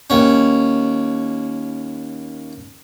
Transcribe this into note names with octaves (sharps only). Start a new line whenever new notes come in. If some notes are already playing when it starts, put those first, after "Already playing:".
D#2 C#4